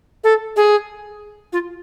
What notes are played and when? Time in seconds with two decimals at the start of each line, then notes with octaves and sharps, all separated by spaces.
0.24 A4
0.56 G#4
1.53 F4